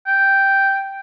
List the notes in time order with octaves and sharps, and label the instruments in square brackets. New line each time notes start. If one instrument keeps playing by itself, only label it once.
[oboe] G5